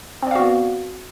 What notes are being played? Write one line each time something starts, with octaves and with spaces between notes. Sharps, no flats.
B3 C4 F#4 D5 F5